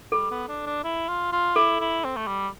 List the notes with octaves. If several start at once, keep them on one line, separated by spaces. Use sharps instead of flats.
G3 A4
B3
D4
D4
E4
F4
F4
E4 A4
E4
C4
A3
G3